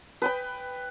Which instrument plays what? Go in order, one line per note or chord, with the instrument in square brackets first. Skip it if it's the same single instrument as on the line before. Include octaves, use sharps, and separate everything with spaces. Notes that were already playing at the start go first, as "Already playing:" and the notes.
[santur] B4 G5 B5